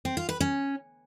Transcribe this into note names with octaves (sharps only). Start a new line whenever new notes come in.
C4
F4
B4
C#4